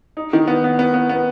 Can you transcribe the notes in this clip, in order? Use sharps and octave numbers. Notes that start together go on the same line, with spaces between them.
D#4
D#3
B3
B3
B3
B3
B3